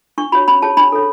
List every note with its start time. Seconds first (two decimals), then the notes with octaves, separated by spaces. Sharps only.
0.18 D4 C#6
0.32 F#4 C#5 B5
0.48 C#4 B5
0.62 G#4 C#5 A5
0.77 D4 B5
0.92 A4 C#5